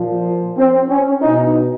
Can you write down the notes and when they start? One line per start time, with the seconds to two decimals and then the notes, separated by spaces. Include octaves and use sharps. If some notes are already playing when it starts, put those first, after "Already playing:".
Already playing: A#2 F3
0.58 C4
0.89 C#4
1.22 B2 D#4